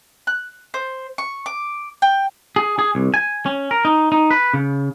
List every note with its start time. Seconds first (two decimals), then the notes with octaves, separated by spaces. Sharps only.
0.27 F#6
0.74 C5
1.18 C#6
1.46 D6
2.02 G5
2.56 G#4
2.79 G#4
2.95 C2
3.14 G#5
3.46 C#4
3.71 A#4
3.85 D#4
4.12 D#4
4.31 B4
4.54 C#3